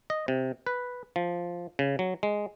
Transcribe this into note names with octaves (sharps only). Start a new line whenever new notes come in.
D#5
C3
B4
F3
C#3
F#3
G#3